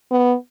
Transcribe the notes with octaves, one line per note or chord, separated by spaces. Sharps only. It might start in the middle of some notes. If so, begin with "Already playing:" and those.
B3